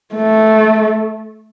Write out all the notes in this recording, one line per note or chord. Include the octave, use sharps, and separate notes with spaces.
A3